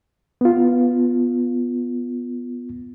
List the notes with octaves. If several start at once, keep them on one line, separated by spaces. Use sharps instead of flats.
B3 F4